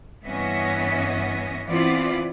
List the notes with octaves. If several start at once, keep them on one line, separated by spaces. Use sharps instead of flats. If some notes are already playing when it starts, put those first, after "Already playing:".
G2 E3 B3 C#4 D#5 E5
E3 B3 C4 E4 F4 D5